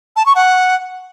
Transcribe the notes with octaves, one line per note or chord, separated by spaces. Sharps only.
A5
C#6
F#5